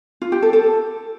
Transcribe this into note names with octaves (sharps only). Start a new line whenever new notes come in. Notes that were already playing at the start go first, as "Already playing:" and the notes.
F4
G4
A4
A4